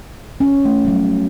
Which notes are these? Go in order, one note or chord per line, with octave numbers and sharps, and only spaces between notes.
C#4
A3
G3
F#3